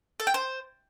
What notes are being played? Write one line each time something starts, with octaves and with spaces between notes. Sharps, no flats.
A4
G5
C5